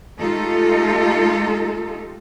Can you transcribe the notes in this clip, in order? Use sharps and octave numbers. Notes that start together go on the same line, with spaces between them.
G#3 A3 D#4 F4 G4 A4